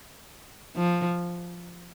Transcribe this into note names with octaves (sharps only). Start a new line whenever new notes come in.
F3